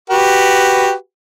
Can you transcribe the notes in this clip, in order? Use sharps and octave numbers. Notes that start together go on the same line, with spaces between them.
F#4 G4 B4